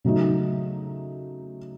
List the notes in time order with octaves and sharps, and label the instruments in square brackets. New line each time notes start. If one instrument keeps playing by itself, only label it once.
[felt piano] C#3 F#3 A3 D#4